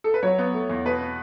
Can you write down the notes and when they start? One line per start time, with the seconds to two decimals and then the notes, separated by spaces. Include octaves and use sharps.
0.04 A4
0.14 B4
0.23 F#3 C#5
0.38 B3
0.54 A3
0.69 E2
0.85 B2 B4
1.01 B3